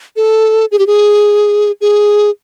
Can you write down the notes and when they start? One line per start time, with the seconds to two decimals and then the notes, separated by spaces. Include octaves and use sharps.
0.16 A4
0.71 G#4
0.79 G4
0.87 G#4
1.81 G#4